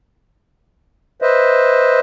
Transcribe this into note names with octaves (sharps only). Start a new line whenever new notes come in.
B4 C5 D#5 E5